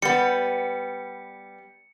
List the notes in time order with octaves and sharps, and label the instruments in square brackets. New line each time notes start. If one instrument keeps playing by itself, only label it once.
[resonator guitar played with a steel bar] G3 B3 [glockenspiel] C#7